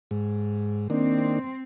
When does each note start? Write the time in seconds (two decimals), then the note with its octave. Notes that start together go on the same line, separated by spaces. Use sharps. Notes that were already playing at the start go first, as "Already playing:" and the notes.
0.11 G#2
0.90 D#3 A#3 C4 D4